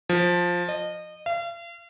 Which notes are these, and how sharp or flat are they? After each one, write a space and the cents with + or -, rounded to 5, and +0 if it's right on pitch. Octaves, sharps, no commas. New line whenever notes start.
F3 +10
D#5 -25
F5 -40